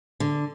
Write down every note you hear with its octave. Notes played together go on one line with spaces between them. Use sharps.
D3